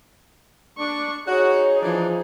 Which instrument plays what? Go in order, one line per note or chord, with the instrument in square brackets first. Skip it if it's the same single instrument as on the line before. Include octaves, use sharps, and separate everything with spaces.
[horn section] D4 [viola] C#6
[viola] D#4 G#4 [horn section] F#4 [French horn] C#5
[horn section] E3 D4 [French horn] F3